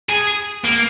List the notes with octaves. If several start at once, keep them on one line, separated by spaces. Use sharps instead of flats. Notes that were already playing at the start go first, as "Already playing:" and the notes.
G#4
A#3